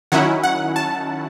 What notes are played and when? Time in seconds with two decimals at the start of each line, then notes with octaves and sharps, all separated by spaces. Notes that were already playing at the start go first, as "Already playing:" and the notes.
0.12 D#3 F#3 C#4 E4 F#5
0.43 F#5
0.76 A5